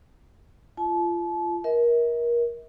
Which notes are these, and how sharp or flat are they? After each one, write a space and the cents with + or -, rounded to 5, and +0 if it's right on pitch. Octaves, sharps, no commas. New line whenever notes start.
F4 -25 A5 -35
A#4 +25 E5 -40